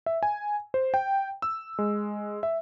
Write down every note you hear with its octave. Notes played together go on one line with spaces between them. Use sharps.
E5
G#5
C5
G5
E6
G#3
E5